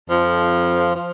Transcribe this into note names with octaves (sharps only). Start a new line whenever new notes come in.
F2 F3
F3